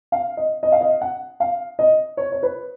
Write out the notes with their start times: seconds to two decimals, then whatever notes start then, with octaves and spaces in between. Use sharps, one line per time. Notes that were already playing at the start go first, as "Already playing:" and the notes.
0.12 F5
0.37 D#5
0.63 D#5
0.72 F5
0.81 D#5
1.01 F#5
1.40 F5
1.79 D#5
2.17 C#5
2.32 C#5
2.43 B4